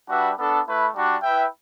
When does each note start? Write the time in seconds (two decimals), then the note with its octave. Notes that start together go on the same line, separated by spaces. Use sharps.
0.08 G3 D4 F#4 B4 E5
0.37 B3 D4 A4
0.66 A3 E4 B4
0.94 G3 D4 F#4
1.23 E4 B4 E5 G5